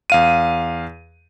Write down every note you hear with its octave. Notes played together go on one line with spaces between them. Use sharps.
E2 F5 D#7